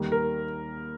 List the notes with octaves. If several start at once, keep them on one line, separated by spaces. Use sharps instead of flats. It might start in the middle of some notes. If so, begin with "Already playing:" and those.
Already playing: D#2 D#3 G3
A#4